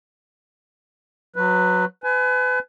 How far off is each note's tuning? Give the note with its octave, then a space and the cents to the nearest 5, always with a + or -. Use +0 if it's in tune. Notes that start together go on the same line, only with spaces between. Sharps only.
F#3 -20 B4 +0
B4 +30 G#5 +30